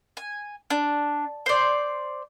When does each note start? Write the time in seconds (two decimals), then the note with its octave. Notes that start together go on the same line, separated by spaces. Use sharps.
0.17 G#5
0.70 D4
1.46 C5 D5